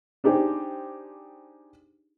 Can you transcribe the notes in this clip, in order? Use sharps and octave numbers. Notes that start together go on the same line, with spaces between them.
D4 D#4 G4 G#4 C5